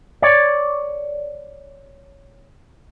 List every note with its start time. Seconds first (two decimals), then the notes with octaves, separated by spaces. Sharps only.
0.22 C#5 D5